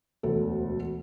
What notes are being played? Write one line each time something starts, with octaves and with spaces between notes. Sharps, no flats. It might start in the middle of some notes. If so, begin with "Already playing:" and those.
E1 D2 A4